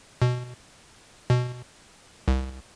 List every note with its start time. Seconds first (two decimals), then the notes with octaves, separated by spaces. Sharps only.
0.22 B2
1.30 B2
2.28 C2